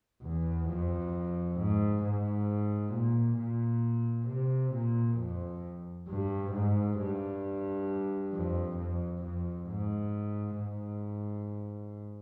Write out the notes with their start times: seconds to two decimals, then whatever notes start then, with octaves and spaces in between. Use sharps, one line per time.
0.23 E2
0.68 F2
1.58 G#2
2.03 G#2
2.93 A#2
3.38 A#2
4.28 C3
4.73 A#2
5.18 F2
6.08 G2
6.53 G#2
6.99 G2
8.33 F2
8.78 F2
9.23 F2
9.68 G#2
10.58 G#2